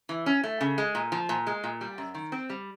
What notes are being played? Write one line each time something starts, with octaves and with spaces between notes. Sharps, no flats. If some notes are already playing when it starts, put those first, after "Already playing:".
E3
C#4
A3
C#3
G#3
A#2
F3
A#2
G#3
A#2
G3
F#2
D#3
C4
G3